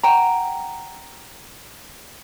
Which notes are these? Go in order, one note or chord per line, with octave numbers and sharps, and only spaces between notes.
F#5 G5 A#5